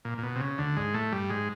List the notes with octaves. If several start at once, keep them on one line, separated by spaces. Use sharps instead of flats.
A#2
A#2
B2
C3
C#3
D2 D3
G#2 G#3
A2 A3
G2 G3
G#2 G#3